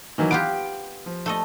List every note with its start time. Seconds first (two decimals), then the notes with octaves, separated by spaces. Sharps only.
0.18 D#3 E3 F#3
0.31 B3 F4 G4 D7
1.06 F3
1.26 A3 A4 D#5